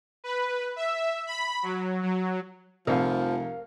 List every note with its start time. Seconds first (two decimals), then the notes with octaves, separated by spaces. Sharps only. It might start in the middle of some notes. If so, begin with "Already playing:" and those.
0.24 B4
0.76 E5
1.27 B5
1.63 F#3
2.03 F#3
2.87 F1 C2 F3 A#4 F5